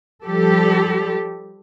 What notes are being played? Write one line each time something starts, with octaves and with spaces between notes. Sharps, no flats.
F3 G3 G4 A4